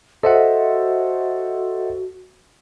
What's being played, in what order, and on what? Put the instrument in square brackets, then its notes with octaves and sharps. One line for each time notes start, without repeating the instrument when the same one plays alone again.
[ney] F#4 [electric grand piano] A4 C5 [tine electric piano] D#5 E5 F#5